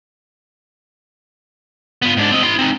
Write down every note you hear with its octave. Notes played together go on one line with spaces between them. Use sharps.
B3 F4
G#2 D4
C4 D#5
E4 C6
C4 D#4